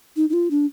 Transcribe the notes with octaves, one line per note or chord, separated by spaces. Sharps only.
D#4
D#4
F4
D4